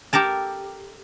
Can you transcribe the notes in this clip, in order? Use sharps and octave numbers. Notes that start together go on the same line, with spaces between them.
G4 A4 A#4 A5